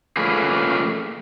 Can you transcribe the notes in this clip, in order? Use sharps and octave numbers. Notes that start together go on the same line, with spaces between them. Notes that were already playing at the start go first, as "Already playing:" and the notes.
F3 A3 A#3 C#4 G#4 B4